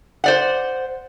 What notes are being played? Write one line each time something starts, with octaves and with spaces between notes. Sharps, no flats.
C5 D5 F#5